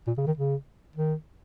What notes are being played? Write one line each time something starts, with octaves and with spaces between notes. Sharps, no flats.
A#2
C#3
D#3
C#3
D#3